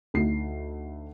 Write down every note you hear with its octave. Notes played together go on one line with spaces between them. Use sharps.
D2 D#4 C7